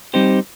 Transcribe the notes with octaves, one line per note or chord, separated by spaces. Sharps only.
G3 C4 D#4 G4 C5